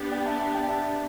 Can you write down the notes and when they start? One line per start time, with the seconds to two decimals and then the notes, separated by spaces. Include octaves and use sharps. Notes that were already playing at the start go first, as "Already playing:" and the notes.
Already playing: B3 D4 G4
0.11 D5 G5
0.26 E5 A5
0.40 E5 A5
0.54 D5 G5
0.68 E5 A5